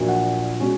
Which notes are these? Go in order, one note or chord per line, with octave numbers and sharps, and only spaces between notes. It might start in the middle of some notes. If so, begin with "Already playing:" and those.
Already playing: A#1 A#2 F#3
F#5
B2 G#3 C#4